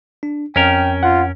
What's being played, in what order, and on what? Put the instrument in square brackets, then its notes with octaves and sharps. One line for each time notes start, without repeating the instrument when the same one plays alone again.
[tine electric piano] D4
[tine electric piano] F2 [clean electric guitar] C#4 A#4 [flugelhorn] G5
[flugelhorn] F4 [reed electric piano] F#5